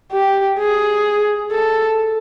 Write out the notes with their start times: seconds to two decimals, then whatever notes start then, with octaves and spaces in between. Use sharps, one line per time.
0.12 G4
0.58 G#4
1.51 A4